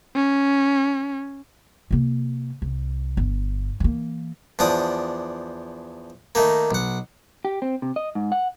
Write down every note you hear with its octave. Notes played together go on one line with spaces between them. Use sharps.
C#4
C3 A#3
C2
G1
E3 A#3
E2 F3 D4 D5 D#6
D#3 A3 A#3
B1 F#5
G4
C4
C3
D#5
G#2
F#5